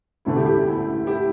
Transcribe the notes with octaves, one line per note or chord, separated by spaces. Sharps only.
E1 D2 D3 A3 E4
E4 G4
E4 G4
E4
E4
E4 G4